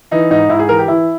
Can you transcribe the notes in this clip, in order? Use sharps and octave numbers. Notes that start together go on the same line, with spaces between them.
E3 D#4
G#2 D#4
G#2 E4
G#4
E3 A#4
G4
E3 E4